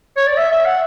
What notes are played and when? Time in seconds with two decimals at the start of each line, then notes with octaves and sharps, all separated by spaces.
0.17 C#5
0.27 D5
0.37 E5
0.51 E5
0.65 F#5